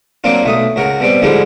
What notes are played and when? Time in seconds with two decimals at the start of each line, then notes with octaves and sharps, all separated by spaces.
0.24 F#3 A#3 C4 D4 F4
0.43 B1 A3 D#6
0.76 C#2 F#4 A#4
1.00 B2 G3 C4
1.22 G#2 D3 F3 G3 G#3